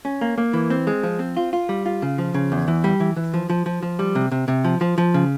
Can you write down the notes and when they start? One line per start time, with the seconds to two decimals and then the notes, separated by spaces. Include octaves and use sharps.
0.05 C#4
0.21 A#3
0.38 A#3
0.53 E3
0.70 C4
0.87 G#3
1.03 F3
1.19 C4
1.37 F4
1.53 F4
1.69 G3
1.86 F4
2.02 C#3
2.18 F3
2.34 C#3
2.52 E2
2.68 E3
2.84 G3
3.00 E3
3.16 E3
3.34 F3
3.50 F3
3.66 F3
3.82 F3
3.99 G3
4.15 C3
4.32 C3
4.48 C3
4.64 F3
4.81 F3
4.98 F3
5.14 C#3